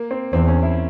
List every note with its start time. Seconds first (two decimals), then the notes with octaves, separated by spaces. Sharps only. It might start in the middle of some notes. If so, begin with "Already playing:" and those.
Already playing: A#3
0.11 C4
0.33 E2 C4
0.48 C#4
0.63 E4